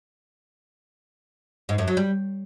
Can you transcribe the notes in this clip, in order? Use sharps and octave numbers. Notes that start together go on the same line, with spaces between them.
G#2
F#2
F#3
G3